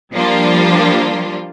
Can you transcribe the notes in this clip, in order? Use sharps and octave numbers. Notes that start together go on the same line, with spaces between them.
F3 G3 A#3 D4 F4